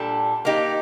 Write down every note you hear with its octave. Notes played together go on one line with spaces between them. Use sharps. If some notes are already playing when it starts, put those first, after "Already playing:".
Already playing: A#2 G3 D4 A4
A#3 D#4 G4